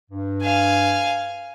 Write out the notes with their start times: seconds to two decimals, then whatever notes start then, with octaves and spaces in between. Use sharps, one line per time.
0.11 G2
0.43 F5 G#5